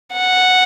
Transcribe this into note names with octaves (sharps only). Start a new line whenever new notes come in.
F#5